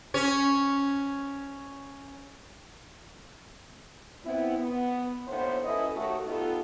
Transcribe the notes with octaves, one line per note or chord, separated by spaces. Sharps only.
C#4 C#5
B3 C4 E4
B3
D#2 A2 B3 D4 C5
F#3 C#4 E4 A4 B4 D#5
D#2 A3 F#4
B3 D#4 F4 G4 A4